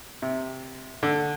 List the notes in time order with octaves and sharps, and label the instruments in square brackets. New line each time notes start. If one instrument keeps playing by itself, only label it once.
[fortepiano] C3
D3